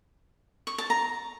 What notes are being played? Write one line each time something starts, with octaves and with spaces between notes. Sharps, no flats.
C#6
A5
A#5